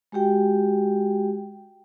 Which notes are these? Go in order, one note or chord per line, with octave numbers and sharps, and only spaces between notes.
G#3 F#4 G4 G5